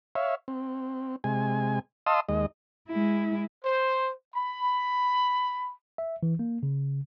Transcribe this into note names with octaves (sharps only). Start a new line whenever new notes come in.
C#5 E5 F5
C4
C3 G#3 G#5
D#5 F5 A5 C6 D#6 E6
D#2 G#3 D#5
G#3 E4
C5
B5
E5
E3
A#3
C#3